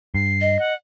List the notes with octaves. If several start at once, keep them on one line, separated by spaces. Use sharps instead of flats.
G2 C7
D#5
F#5